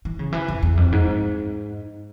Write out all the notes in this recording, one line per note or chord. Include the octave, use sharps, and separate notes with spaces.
E3
C#3
E3
F2
E2
F2
G#2